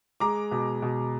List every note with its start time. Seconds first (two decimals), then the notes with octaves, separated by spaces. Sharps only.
0.20 G#3 A#5 D6
0.51 B2
0.82 B2